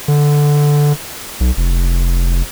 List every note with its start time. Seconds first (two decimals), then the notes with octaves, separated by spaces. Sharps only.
0.08 D3
1.40 B1
1.57 F1